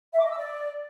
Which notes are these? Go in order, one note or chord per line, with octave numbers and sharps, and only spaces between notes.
E5
D6
D#5
E6
D5